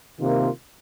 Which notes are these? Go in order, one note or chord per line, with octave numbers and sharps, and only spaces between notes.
C3 D#3 A#3 F4